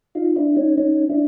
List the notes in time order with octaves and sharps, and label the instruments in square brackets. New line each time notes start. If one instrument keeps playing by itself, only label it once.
[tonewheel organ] D#4 F4
D4 E4
C#4 D#4
C#4 D#4
D4 E4